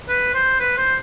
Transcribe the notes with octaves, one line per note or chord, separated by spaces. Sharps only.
B4
C5
B4
C5